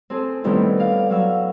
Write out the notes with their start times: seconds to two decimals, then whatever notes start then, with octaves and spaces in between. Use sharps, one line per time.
0.10 C4 G#4 A4
0.44 A2 D#3 G3 B3 C4 E4
0.77 D5 F5
1.10 F#3 F5 C#6 E6